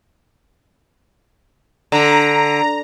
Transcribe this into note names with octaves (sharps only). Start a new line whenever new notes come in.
D3 A#5